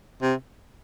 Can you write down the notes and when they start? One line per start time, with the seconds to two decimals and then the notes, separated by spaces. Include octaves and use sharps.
0.22 C3